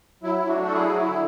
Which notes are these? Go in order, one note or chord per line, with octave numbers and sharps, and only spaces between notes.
F#3 E4
F#3
D4 F#4
A3
A4
F#3 E4 G#4
F#3 F#4
E4
D3